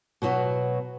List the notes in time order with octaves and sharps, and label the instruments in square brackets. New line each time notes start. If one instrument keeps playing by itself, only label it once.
[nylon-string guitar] B2 F#3 B3 F#4